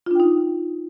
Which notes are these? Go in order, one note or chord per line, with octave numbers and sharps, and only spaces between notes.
D4 D#4 F4 G5